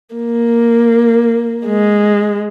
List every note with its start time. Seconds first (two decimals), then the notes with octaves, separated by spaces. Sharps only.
0.15 A#3
1.67 G#3